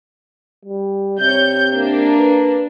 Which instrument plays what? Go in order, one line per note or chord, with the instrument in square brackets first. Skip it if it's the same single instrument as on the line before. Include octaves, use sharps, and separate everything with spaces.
[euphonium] G3
[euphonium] C3 [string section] C#5 G6
[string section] A#3 D4
[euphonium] B4